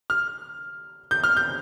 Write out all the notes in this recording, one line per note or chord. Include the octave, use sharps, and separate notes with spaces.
F6
G6
F6
G6